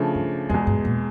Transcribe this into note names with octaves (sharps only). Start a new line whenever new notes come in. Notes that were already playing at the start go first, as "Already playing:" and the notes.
Already playing: C#3 F3 A3 D4
G2
E2 F2 B2 G#3
G2
A#2